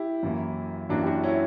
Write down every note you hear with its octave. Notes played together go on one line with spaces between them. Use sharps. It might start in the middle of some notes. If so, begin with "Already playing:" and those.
Already playing: E4 G4
F#2 E3 A#3
F#2 E3 A#3 D4 F#4
G4
D4 F#4
C#4 E4